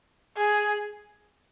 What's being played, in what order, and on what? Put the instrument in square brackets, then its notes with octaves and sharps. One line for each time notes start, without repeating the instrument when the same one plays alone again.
[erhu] G#4